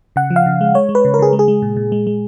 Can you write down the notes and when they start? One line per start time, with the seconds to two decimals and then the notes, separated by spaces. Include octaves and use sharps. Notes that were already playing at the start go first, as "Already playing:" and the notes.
0.16 C#3 F#5
0.30 F3
0.36 F5
0.46 C#3
0.61 G#3
0.74 G#3 C#5
0.89 G#3
0.95 B4
1.05 C#3
1.14 A#4
1.19 C#3 G#4
1.33 G#3
1.39 G#4
1.48 G#3
1.62 A#2
1.77 A#2
1.92 G#3
2.07 G#3